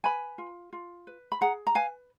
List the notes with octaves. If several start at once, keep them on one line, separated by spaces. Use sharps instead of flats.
B4 G#5 B5
F4
F4
B4
B5
G#4 F#5 A#5
A#5
B4 F5 G#5